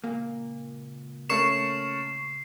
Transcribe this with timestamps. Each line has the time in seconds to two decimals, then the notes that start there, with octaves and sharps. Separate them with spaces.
0.04 C#2 A#2 A#3
1.29 A3 C#4 A#4 C#6 C7 E7